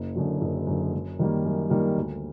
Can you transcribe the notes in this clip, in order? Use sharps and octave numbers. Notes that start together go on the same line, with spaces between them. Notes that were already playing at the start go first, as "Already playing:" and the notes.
Already playing: F#1
F#2 D3 F#3
F#1
F#2 D3 F#3
F#2
D#3 G3 A#3
F#2
D#3 G3 A#3
D2